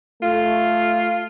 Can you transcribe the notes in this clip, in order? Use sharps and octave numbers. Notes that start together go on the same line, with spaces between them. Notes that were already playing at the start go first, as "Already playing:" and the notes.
A3 F4